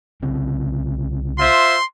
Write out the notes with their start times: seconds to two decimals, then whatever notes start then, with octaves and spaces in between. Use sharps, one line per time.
0.22 C2 C#3 C4
1.39 F4 C5 E5 C6